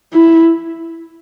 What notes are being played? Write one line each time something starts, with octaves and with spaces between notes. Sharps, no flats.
E4